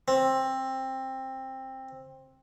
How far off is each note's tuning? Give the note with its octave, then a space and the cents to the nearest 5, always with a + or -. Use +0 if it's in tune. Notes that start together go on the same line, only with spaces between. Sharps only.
C4 +15